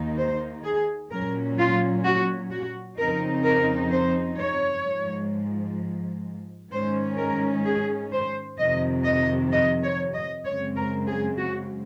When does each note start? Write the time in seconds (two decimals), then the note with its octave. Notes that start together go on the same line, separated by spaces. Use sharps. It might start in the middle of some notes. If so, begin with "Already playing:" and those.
Already playing: D#2 D#3 A#3 D#4
0.17 C5
0.64 G#4
1.11 A#2 F#3 C#4 A#4
1.57 F4
2.04 F#4
2.50 F#4
2.97 F2 C#3 F3 C4 D#4 A#4
3.44 A#4
3.91 C5
4.37 C#5
4.85 G#2 F3 G#3
6.71 G#2 D#3 G#3 C#4 C5
7.17 A#4
7.64 G#4
8.11 C5
8.58 F2 C3 D#3 D#5
9.04 D#5
9.52 D#5
9.83 C#5
10.13 D#5
10.45 F#2 C#3 G#3 C4 C#5
10.76 A#4
11.07 G#4
11.37 F#4